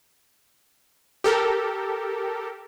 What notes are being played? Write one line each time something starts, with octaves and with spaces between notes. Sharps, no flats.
G4 A4 A#4